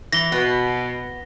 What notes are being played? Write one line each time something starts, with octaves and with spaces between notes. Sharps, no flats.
E3 A#6 G7
B2 B3